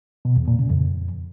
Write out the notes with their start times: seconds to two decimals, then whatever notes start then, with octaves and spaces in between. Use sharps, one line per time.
0.25 B2
0.36 E2
0.48 A#2
0.59 C#3
0.70 F2